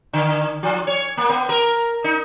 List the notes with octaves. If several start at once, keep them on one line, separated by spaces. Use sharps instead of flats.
D3
F3
C#5
A#3
B3
A#4
D#4